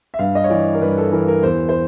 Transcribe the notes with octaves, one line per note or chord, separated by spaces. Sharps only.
E5
G2 F5
D#5
C#5
E3 D5
A#4
G2 B4
A4
E3 A#4
A#4
E2 C5
C5